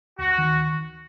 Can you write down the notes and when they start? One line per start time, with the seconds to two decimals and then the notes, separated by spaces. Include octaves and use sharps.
0.19 D2 F#4
0.38 D#3